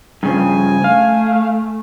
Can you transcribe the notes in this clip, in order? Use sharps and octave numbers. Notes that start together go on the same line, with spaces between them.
G2 C#3 F3 G#5
A3 F5